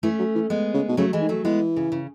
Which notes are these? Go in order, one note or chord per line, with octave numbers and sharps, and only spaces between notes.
E3 A3 C#4
F#3
E3
G#3 B3
C#3
B2
C#3 F#3 A3
E3 G#3
D#3
F#3 A3
E3 G#3 B3
C#3
C#3